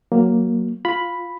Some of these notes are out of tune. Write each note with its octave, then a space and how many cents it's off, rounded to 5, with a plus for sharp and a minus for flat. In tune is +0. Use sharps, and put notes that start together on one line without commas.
F#3 +0 A#3 +0
F4 +5 B5 +0